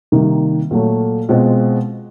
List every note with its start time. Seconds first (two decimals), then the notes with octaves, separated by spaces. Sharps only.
0.12 C3 D#3 G3 A#3
0.71 A#2 F#3 A3
1.29 B2 G#3 C4 F4